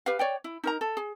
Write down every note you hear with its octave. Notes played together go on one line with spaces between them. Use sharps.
G4 B4 F5
C#5 D5 G5
E4
D#4 A#4 A#5
A4
G#4